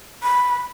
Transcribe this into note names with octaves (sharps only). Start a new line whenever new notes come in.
B5